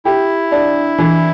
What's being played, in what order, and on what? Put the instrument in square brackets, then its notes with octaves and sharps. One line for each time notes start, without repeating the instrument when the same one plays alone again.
[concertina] E4 [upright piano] G4
[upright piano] D4
E3